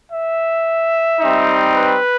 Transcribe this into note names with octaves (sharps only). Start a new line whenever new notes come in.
E5
G3 C4 D#4
B4